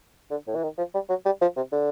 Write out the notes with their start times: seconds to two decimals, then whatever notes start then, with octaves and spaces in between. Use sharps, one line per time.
0.31 D3
0.47 A2
0.55 E3
0.63 D#3
0.78 F3
0.94 G3
1.09 F#3
1.25 G3
1.41 F3
1.56 C3
1.72 D3